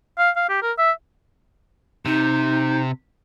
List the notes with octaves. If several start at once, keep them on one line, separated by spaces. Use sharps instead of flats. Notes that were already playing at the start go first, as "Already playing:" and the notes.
F5
F5
G4
A#4
E5
C3 D#4